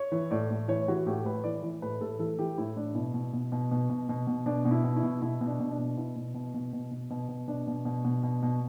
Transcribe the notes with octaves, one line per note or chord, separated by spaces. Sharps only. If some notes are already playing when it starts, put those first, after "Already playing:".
Already playing: C#5
E3
A2 D5
A2
E3 C#5
E3 F#4
A2 G4
A2 B4
E3 D5
E3
A2 B4
A2 A4
E3 A4
E3 G4
A2 E4
A2 D4
B2 E4
B2
B2
B2
B2
B2
B2
B2
B2 D4
B2
E4
B2
E4
B2
B2 E4
B2
D4
B2
D4
B2
B2 E4
B2
B2
B2
B2
B2
B2
B2
B2 D4
B2
B2
B2
B2
B2